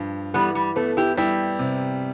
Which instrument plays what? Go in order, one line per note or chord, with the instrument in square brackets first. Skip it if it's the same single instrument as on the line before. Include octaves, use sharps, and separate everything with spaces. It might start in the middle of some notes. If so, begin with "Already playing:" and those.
Already playing: [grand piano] G2 F3
[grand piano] E3 [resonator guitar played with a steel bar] G3 B3
[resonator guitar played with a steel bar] G3
[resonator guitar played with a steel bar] A3 [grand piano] B3
[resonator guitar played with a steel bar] E4 G4
[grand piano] G3 [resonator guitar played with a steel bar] E4 G4
[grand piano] C3